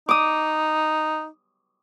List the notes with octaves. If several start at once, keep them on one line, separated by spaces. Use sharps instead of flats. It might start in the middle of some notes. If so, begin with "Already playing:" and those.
D#4 D6 D#6